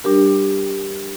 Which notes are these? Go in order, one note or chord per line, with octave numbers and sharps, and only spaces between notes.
G3 D4 G4 A#4